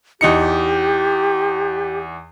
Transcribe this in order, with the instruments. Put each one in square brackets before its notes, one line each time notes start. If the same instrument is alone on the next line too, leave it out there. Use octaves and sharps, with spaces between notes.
[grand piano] E2 D#4 C#7 [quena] G4